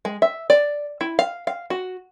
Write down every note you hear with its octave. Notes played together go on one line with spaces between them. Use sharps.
G#3
E5
D5
E4
F5
F5
F#4